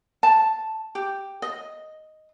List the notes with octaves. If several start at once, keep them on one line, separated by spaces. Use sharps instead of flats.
A5
G4
D#5